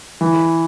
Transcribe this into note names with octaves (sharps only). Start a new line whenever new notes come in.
E3